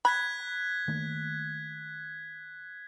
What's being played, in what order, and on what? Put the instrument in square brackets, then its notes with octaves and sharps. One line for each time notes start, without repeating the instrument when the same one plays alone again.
[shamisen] B5 [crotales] F#6 G#6 B6
[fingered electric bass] D#3 A3 A#3